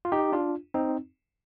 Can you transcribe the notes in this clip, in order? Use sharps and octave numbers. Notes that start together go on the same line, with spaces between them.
F4
D#4 G4
D4 F4
C4 D#4